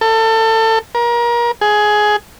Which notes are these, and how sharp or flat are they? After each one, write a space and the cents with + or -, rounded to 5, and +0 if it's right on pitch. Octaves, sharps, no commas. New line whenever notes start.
A4 +25
A#4 +30
G#4 +15